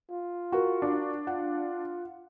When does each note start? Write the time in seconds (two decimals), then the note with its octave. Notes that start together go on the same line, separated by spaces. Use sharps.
0.10 F4
0.52 F#4 A#4
0.82 D4
1.27 F4 F#5